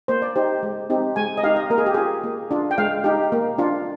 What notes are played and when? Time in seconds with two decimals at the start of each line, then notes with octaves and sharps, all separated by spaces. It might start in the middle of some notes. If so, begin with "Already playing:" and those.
0.08 A#3 C5
0.22 D5
0.36 D#4 G4 C5
0.63 G#3
0.90 C4 D#4 G4
1.16 G#3 G#5
1.37 D#5
1.43 D#4 G4 F5
1.56 D#5
1.70 A#3 A#4
1.78 G#4
1.86 G4
1.94 F4 G#4
2.24 A#3
2.51 D4 F4
2.71 G5
2.78 G#3 F5
3.04 D#4 G4
3.32 A#3
3.58 D4 F4